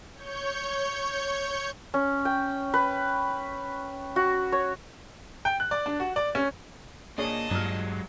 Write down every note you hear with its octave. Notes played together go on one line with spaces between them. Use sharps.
C#5 C#6 G6
C#4
G5
B4
F#4
C#5
G5
F#6
D5
D4
F#4
D5
C#4
A#2 D4 G#4 C#5 D#5 A5
G2 A#2 F#3 G#3 F6